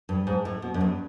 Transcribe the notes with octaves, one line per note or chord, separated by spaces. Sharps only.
G2
G#2
A2
B2
F#2
G2